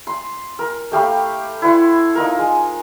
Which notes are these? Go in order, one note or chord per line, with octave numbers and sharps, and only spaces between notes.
C6
A#4
A3 G4 F5 B5
E4 C5 F#5 C6
D#4 F4 A#4
G#3